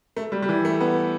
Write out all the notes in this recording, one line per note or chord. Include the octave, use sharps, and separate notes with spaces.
A3
G3
G3
E3
A3
B3